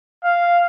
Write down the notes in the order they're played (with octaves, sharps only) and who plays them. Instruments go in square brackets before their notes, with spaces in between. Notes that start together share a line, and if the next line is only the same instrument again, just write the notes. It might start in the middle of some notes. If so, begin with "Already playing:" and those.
[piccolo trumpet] F5